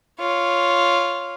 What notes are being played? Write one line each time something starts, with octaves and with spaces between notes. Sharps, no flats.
F4 C#5